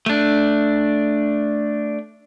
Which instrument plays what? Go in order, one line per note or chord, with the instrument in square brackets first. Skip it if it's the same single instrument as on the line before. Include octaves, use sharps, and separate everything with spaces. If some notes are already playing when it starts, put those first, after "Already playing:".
[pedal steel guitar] A3 D4